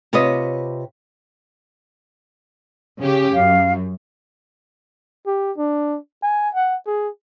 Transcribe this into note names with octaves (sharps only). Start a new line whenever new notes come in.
C3 F4 B4 C#5 D#5
C#3 C#4 G4
F#2 F5
G4
D4
G#5
F#5
G#4